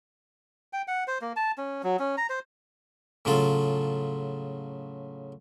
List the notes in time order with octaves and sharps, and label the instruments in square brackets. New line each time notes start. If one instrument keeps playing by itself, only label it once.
[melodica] G5
F#5
C5
A#3
A5
C#4
F#3
C#4
A#5
C5
[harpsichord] A2 C#3 F#3 F4 A4